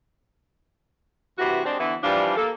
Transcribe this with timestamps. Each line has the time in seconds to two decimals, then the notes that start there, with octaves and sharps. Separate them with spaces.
1.38 G2 C3 E3 F#4
1.65 G#3 C4 D4 G4
1.79 D3 E3 B3 E4
2.03 E3 F3 G3 D4
2.36 A#3 A4